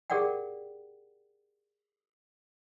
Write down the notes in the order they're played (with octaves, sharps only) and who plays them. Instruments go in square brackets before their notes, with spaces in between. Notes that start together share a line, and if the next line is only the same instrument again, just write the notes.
[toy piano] G4 G#4 A#4 D5 F#5 G5